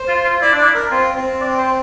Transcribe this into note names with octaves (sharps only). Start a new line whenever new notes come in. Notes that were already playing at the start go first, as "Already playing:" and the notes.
Already playing: C5
F4
F4
E4 D5
D4 D5
E4
A#4
C4 F4
C4
D5
C5